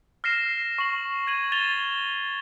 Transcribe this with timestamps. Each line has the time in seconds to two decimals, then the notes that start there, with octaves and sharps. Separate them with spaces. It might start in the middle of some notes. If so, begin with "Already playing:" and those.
0.24 F6 A#6 C7 E7
0.78 C#6 F#7
1.27 G#6 D#7 F#7
1.52 A6 E7 F7 G7